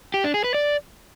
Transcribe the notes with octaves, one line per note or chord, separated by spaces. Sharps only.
G4
D4
G#4
B4
D5